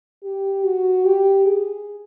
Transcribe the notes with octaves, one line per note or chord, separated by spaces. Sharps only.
G4
F#4
G4
G#4